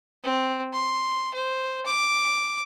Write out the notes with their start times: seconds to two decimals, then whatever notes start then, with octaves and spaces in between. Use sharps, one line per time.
0.24 C4
0.73 C6
1.34 C5
1.86 D6